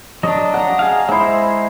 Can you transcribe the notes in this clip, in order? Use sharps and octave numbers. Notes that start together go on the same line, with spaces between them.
F#3 D4 D#5
F#5 A#5
G#4 F5
G#3 E4 C5 E5